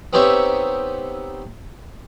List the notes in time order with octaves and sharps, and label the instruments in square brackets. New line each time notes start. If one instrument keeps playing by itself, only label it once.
[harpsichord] B3 C4 D#4 G4 C#5 E5